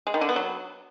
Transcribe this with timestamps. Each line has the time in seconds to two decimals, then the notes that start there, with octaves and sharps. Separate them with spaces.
0.07 G#3
0.14 D#3
0.21 D3
0.29 B3
0.36 F#3